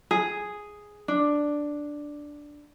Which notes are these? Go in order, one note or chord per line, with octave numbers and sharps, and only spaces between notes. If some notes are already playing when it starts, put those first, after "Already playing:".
G#4
D4